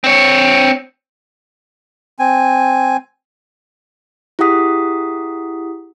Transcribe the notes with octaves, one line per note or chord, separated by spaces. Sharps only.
C4 C#5
C4 G#5
E4 G4 G#4 F#5 D#6 B6